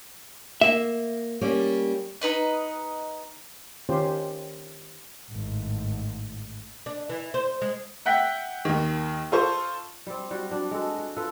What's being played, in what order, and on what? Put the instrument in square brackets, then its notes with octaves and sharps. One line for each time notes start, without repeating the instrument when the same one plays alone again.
[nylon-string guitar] A#3 [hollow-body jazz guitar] E5
[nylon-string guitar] G3 A#3 C#4
[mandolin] D#4 B4 D#5
[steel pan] D#3 C#4 F4 G4 C5
[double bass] G#1 A2
[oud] D4
E3
C5
G#3
[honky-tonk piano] E5 F#5 G5 B6
D#2 D#3
F4 A4 C5 C#6
[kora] G3 C4
G3 F#4
G3 D4 F#4
G#3 F#4 A4
F#4
F4 A4 B4